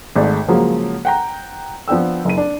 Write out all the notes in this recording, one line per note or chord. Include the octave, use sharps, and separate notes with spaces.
G#1 G#2 G#3 A3 D5
C#3 F3 F#3 G#3 A#3
F#5 G5 A#5
F3 B3 D4 G5 E6
F#1 D#7
D4